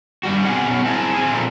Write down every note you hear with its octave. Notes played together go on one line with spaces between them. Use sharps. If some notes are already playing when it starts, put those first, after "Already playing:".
G2 G3 F#4
B2 C4 G4 G#4 F#5
B2 F#3 C#4
C4 E4 G#4 A#4 A5
C4 G#4
A#2 F3 A3 A#3 C4